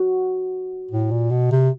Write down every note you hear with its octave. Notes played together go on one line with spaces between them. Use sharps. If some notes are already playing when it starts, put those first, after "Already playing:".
Already playing: F#4
A2
A#2
B2
C3